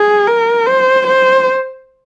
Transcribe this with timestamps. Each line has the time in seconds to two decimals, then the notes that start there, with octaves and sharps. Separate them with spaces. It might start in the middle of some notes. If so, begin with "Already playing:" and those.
Already playing: G#4
0.27 A#4
0.66 C5
1.07 C5